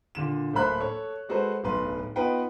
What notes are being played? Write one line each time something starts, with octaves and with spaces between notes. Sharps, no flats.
A#2 D3 E7
D1 A3 A#3 C5 B5 F#6
A4 C#5
G#3 F#4 A4 B4 C5
D1 B1 B4 C6
B3 D#4 F4 B4 F#5 G5